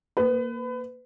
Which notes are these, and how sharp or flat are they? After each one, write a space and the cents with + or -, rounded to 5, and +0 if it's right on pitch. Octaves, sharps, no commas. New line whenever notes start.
A#3 +0 B4 +25